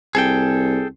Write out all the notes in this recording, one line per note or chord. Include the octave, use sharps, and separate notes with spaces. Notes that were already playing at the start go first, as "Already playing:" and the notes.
C2 G#4 A4 G5